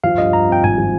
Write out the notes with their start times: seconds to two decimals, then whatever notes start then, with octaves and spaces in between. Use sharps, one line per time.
0.03 F3 F5
0.18 G2 D#5
0.33 G2 A#5
0.49 C4 G5
0.64 G#1 G#5
0.78 F3